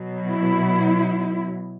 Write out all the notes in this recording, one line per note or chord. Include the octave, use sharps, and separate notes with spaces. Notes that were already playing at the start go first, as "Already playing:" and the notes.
Already playing: B2 F#3
E4